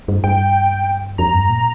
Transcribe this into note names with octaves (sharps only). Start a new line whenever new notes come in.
G2
G2 G5
F2 A#5
G2
A#2